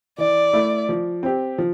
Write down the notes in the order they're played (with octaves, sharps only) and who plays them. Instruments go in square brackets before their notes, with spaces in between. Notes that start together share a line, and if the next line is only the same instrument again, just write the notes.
[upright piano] E3 [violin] D5
[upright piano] A3 E4
F3
C4 G4
F3